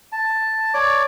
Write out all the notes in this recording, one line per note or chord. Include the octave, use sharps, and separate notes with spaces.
A5
C#5 D5 D6